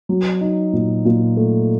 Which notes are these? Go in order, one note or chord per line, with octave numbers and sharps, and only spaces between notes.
F#3
D#4
A#2
A#2
A3